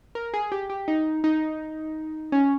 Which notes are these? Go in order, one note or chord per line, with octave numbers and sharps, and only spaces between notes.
A#4
G#4
G4
G4
D#4
D#4
C#4